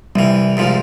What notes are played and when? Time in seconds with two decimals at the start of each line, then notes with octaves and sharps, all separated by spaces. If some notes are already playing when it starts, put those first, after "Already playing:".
0.16 C2 E3 G3
0.57 C2 G#2 F3